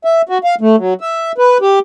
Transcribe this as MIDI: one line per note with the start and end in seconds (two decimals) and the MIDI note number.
0.05 0.22 76
0.29 0.38 66
0.44 0.55 77
0.61 0.76 57
0.78 0.94 54
1.01 1.32 76
1.38 1.58 71
1.61 1.79 67